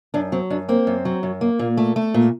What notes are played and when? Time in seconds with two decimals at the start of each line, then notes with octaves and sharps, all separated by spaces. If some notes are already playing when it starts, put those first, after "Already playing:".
0.14 F#2 D4
0.32 F#3 C4
0.50 F#2 D4
0.69 A#3 C4
0.87 F#2
1.05 F#3
1.23 F#2
1.41 A#3
1.59 A#2
1.77 A3
1.96 A3
2.14 A#2